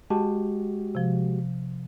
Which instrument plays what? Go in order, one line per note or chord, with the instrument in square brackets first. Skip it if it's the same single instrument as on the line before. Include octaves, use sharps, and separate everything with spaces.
[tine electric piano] G#3 F#4 G4 [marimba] A5
[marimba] C3 F3